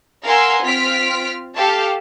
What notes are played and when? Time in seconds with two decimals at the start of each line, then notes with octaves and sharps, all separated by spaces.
0.24 A#4 F5 F#5 G#5 C6 E6
0.62 C4 F4 F6 B6 D7
1.56 G4 A4 F5 A5